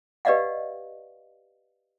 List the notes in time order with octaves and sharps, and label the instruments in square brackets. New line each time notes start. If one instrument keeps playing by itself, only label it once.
[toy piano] G4 B4 D5 D#5 F5 F#5